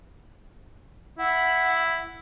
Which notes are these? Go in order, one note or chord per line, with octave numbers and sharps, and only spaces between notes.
E4 F#5